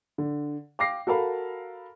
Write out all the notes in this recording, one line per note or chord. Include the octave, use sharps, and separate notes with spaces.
D3
F5 G5 D6 A#6 C7
F#4 A4 A#4 F5 B5